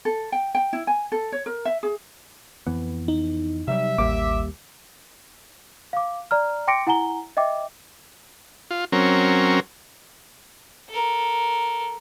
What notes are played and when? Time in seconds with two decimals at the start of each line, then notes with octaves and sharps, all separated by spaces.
0.05 A4
0.32 G5
0.55 G5
0.73 E4
0.87 G#5
1.12 A4
1.32 C#5
1.46 A#4
1.65 E5
1.83 G#4
2.67 F2 E3 B3
3.08 D#4
3.68 C3 F#3 G3 E5
3.98 A1 D#2 G3 A#3 D6
5.93 F5 D6
6.31 D5 A#5 F6
6.68 G5 C6 D6 A#6 C#7 D7
6.87 E4 F#5 G#5 A#5 G7
7.37 D#5 E5 G5 D6
8.71 F4
8.92 F#3 C4 C#4 A#4
10.90 A4 A#4